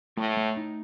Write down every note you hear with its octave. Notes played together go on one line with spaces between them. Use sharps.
A2 A3
A3
D#4